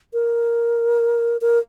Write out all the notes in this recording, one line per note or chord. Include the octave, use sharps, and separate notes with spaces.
A#4
A#4